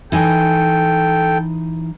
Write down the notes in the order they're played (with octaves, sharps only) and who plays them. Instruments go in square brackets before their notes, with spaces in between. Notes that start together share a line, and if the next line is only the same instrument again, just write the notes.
[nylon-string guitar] E3 D#4 G#5 [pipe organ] A4 G5